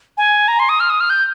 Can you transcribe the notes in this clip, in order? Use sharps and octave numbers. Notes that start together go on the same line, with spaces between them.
G#5
A#5
C6
D#6
F6
D#6
F6
G6